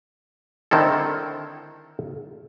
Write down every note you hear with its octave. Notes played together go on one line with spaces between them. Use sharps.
D3 D#3 C4 E4 A4